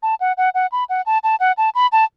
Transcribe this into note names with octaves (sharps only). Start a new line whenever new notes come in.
A5
F#5
F#5
F#5
B5
F#5
A5
A5
F#5
A5
B5
A5